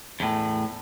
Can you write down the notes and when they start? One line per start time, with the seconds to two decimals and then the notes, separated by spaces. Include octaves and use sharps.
0.20 E2 A2